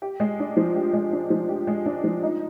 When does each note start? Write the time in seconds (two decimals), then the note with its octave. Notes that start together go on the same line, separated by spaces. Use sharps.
0.02 G4
0.20 G#3
0.39 D4
0.57 F3
0.75 G4
0.93 G#3
1.13 D4
1.30 F3
1.49 G4
1.67 G#3
1.86 D4
2.04 F3
2.23 D#4